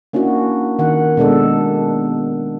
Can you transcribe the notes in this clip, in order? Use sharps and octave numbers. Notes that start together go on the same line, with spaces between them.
A#3 C#4 D4 E4 F#4
D#3 F#5
B2 G#3 D4 A4